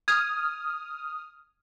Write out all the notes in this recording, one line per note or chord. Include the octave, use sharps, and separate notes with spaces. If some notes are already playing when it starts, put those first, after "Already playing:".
D#6 F6 G#6